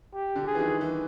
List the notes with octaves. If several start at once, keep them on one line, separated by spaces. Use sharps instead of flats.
G4
D3
G#4
E3
D#3
E3